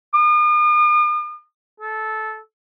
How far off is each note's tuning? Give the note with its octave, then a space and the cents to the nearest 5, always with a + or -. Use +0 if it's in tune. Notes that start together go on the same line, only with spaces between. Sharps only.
D#6 -45
A4 -15